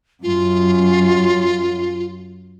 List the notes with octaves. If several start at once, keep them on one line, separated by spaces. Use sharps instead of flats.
F#2 F4